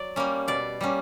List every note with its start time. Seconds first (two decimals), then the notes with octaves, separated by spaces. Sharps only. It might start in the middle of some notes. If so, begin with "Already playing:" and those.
Already playing: F#3 D5
0.16 G3 A#3 C#4
0.48 B2 D5
0.81 G3 A#3 C#4